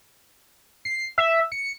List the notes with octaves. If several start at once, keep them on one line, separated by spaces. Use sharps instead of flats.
C7
E5
C#7